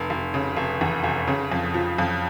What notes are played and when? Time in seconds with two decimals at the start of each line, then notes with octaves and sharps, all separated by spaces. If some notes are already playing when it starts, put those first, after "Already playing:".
Already playing: F1
0.10 F1
0.34 C#3
0.57 F1
0.81 E2
1.04 F1
1.28 C#3
1.52 F2
1.74 F3
1.98 F2